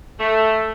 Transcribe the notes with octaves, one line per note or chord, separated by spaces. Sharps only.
A3